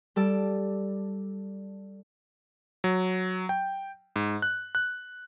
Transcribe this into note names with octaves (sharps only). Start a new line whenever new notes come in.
G3 A4 D5
F#3
G5
G#2
F#6
F#6